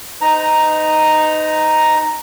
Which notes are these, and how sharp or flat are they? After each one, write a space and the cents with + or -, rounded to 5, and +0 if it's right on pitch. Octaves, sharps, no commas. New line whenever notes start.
D#4 +0 C5 -45 A#5 +0